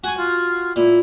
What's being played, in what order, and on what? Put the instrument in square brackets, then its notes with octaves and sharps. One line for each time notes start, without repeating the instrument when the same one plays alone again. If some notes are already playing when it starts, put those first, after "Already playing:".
[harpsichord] F#4 C#6 [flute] G#5
[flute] F4
[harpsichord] A#2 [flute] E4